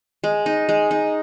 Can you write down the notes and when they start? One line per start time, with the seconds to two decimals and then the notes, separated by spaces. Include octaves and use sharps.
0.24 G#3
0.46 D#4
0.69 G#3
0.91 D#4